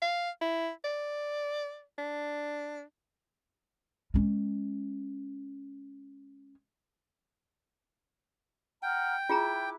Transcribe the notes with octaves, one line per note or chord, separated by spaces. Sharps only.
F5
E4
D5
D4
G#3 C#4
F#5 G5 A#5 F6
E4 F4 G#4 A#5 D6 F#6